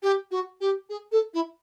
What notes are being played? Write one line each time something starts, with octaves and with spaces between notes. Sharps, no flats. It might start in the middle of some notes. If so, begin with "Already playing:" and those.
G4
F#4
G4
G#4
A4
E4